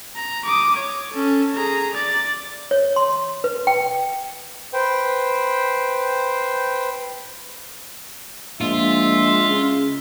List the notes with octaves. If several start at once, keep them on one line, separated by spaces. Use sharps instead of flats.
A#5
D6 D#6
C#5
C#4 A4
G#4 A#5
D5 A6
C#5
C6
B4
G5
B4 C5 G5
A#1 G#3 F4 E5
C#3